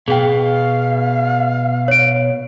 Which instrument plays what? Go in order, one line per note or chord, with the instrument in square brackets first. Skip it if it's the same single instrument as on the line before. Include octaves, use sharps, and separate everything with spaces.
[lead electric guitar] B2 B3 [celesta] G#4 G5 [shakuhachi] F5
[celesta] C#5 D7